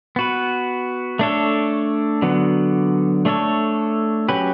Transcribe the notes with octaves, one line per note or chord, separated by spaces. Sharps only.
B3 F#4 B4
A3 D4 A4 C#5
D3 F#3 B3
A3 D4 A4 C#5
F#3 C#4 G4 B4